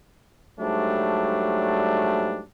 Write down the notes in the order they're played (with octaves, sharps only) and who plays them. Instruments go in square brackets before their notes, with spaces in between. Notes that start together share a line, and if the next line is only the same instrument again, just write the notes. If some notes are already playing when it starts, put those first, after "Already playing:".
[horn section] G#2 F#3 G3 A3 D4